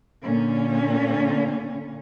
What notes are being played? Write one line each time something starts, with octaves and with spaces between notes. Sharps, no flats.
A#2 D3 C#4